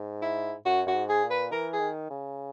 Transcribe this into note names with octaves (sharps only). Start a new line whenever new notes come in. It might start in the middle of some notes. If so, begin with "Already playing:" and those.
Already playing: G#2
E4
F#2 F#4
F#2 F#4
G#2
G#4
A#2
B4
E3 A#4
G#4
D#3
C#3